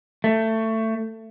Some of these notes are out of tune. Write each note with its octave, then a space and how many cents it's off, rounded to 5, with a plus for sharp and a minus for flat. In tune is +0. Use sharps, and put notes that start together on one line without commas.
A3 +20